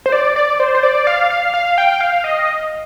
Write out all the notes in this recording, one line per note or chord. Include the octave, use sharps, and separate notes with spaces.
C5
D5
D5
C5
C5
D5
F5
F5
F5
G5
F5
D#5